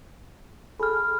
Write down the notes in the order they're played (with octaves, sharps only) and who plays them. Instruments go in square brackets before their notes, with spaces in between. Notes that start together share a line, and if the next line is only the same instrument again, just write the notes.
[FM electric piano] G#4 A4 [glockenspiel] B5 F6